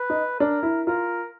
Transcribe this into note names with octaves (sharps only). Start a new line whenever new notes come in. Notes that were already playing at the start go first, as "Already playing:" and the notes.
Already playing: B4
D#4
D4 A#4
E4
F4 A#4